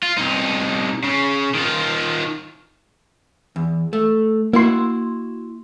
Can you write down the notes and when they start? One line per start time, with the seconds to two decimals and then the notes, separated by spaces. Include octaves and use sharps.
0.03 F4
0.17 C2 D#4
1.04 C#3
1.55 D#3 F4
3.56 E2
3.93 A3
4.53 A#3 E4 F#4 C6